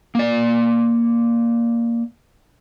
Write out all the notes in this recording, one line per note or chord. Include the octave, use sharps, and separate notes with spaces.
A#3 D5